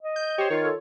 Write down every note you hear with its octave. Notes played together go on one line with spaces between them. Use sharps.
D#5
G6
G4 C5 C#5
D#3 F4 C#5
A4